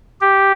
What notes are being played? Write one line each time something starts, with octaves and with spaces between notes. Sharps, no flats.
G4